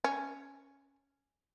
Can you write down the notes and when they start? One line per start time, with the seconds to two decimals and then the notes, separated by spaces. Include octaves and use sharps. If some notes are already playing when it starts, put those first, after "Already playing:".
0.04 C#4